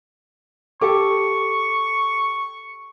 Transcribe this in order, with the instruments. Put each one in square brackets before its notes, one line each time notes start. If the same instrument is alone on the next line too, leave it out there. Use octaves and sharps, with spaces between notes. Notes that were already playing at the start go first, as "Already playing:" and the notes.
[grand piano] G4 A4 D6 [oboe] C#6